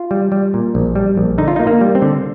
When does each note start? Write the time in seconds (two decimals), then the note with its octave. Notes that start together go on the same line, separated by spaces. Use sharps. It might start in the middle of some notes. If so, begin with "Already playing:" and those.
Already playing: F4
0.11 G3
0.32 G3
0.54 A#2
0.75 A#1
0.95 G3
1.17 A#1
1.38 D3 D#4
1.48 F4
1.56 A#3 D#4
1.67 A#3
1.81 G3
1.95 C4
2.02 D3